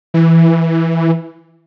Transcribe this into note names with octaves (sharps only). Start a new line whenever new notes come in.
E3